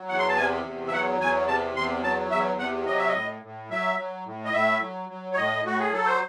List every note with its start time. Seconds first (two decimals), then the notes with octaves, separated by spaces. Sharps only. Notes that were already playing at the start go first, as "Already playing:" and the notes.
Already playing: F#3
0.09 E2 F#5
0.18 C6
0.28 A5
0.37 C3 G#5
0.65 E2
0.87 E5
0.92 F#3 F#5
1.20 E2 G#5
1.48 C3 A5
1.76 E2 C6
2.03 F#3 A5
2.31 E2 E5
2.59 C3 F#5
2.86 F#3 D#5
2.98 E5
3.08 D#5
3.15 A2
3.43 A2
3.70 F#3 E5
3.98 F#3
4.25 A2
4.45 D#5
4.53 A2 E5
4.81 F#3
5.09 F#3
5.32 C#5
5.36 A2 D#5
5.64 A2 F#4
5.79 G#4
5.92 F#3 A4
6.06 C5